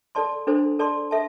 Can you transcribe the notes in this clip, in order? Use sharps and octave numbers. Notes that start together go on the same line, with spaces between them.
A4 D5 A5 C6
D4 A4 C5
A4 D5 A5 C6
A4 E5 A5